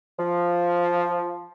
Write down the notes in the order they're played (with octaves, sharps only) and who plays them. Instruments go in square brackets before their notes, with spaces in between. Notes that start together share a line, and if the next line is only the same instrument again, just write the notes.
[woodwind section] F3